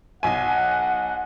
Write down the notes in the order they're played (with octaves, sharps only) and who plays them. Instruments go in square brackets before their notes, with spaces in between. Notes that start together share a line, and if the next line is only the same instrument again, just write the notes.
[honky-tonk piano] B1 G#5 [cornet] F#5